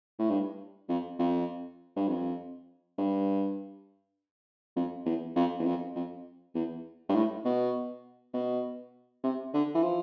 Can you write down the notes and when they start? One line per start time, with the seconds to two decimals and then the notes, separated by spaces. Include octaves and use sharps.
0.19 A2
0.30 G2
0.89 F2
1.19 F2
1.96 G2
2.08 F2
2.98 G2
4.76 F2
5.06 E2
5.36 F2
5.59 E2
5.66 F2
5.96 F2
6.55 E2
7.09 G2
7.15 A2
7.45 B2
8.34 B2
9.24 C3
9.54 D3
9.75 E3
9.83 F3